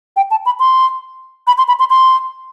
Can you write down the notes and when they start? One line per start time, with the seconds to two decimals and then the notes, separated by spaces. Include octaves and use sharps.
0.17 G5
0.31 A5
0.46 B5
0.60 C6
1.47 B5
1.58 C6
1.68 B5
1.79 C6
1.90 C6